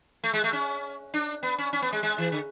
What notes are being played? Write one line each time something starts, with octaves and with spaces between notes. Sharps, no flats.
A3
G#3
A3
C#4
D4
B3
C#4
C#4
B3
G#3
G#3
E3
D3